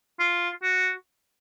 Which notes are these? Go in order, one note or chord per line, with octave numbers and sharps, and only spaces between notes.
F4
F#4